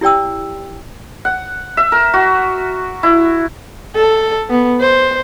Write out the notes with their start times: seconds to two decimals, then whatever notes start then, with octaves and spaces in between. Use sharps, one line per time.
0.01 E4 G4 D5 G5 E6
1.25 F#5
1.77 E5
1.92 A#4
2.14 F#4
3.03 E4
3.95 A4
4.50 B3
4.80 C5